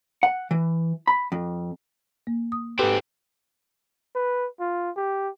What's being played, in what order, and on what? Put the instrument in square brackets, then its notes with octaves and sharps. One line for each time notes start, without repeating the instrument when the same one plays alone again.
[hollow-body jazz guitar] F#5
E3
B5
F2
[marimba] A#3
D#6
[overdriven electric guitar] G#2 C4 [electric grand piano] G4 A4 B4
[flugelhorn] B4
F4
G4